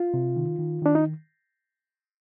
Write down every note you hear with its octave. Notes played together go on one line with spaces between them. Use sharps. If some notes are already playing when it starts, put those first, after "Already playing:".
Already playing: F4
C3
D#3
D#3
D#3 D4
D#4